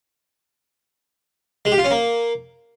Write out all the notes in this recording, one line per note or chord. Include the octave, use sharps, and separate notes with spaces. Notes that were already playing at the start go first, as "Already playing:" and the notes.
G#3
G4
F4
C#4
A#3